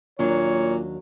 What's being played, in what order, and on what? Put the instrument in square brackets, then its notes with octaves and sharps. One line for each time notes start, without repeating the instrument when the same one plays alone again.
[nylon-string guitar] D#2 F#3 D4 [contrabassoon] A#2 [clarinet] C#5